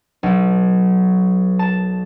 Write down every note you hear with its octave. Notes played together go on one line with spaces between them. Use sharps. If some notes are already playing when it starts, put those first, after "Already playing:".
B1
A5